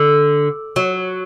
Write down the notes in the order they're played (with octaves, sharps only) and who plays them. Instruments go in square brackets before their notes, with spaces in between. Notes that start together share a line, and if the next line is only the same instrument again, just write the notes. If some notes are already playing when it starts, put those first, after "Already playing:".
Already playing: [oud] D3
F#3